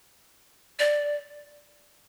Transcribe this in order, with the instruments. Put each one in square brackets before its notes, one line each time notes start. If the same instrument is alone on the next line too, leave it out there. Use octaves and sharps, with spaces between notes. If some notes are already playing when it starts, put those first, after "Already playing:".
[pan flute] D5